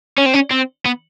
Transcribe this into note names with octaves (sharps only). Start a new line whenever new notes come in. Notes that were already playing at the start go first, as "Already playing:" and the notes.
C#4
C4
C#4
C4
B3